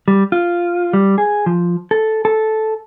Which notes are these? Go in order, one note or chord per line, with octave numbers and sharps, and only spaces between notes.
G3
F4
G3
G#4
F3
A4
A4